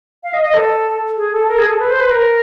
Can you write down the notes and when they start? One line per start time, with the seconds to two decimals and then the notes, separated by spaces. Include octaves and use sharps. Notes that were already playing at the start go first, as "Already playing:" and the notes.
0.23 F5
0.34 D#5
0.44 D#5
0.54 A4
1.17 G#4
1.32 A4
1.48 A#4
1.58 G#4
1.69 A4
1.79 B4
1.90 C5
2.00 B4
2.10 A#4